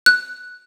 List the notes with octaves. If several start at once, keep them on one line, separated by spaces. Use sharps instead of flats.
F#6